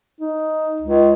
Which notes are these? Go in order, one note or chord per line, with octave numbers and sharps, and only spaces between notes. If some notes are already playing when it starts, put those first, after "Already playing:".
D#4
C#2